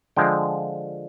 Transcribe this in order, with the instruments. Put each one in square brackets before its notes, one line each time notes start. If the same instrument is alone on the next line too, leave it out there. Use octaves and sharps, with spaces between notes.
[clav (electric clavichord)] D3 F3 G#3 G5